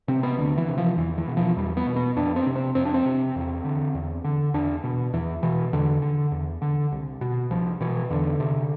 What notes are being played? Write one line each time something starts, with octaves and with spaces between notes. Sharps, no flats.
C3 C4
B3
D2 D3
E3
C3
F3
E2 E3
E3
B2
F3
E2 G3
B3
B2
B3
F2 D4
C4
C3
C4
F2 C4
D4
C4
C3
E2
D3
E2
D3
E2 D4
B2
E2 E3
B2 E3
E2 D3
D3
E2
D3
C2
B2
C2 F3
B2 E3
E2 D3
C3